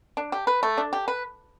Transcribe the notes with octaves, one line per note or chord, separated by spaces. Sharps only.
D4
G4
B4
A3
D4
G4
B4